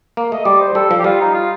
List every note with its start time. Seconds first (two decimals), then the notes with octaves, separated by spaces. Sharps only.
0.17 A#3
0.32 A3 D#5
0.45 G3 D5
0.61 C5
0.75 G3 A4
0.91 F3
0.99 G4
1.04 G3 F4
1.20 D#4
1.34 F4